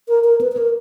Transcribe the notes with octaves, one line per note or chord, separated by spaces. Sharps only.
A#4
A#4
B4
B4
A#4